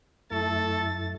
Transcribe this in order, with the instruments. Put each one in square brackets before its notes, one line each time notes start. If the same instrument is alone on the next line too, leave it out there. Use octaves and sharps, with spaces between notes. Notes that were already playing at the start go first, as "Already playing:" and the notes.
[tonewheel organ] F#2 E4 [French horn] A3 [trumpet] A4 [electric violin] A6